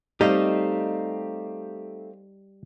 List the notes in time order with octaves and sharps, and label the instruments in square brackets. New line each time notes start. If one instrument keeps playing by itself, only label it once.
[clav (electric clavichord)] G3 [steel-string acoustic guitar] A3 C4 [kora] D#4 [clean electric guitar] G4 D#5 F5